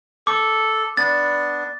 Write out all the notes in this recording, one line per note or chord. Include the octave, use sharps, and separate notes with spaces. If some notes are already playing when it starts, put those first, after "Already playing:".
A4 D6
B3 D4 A6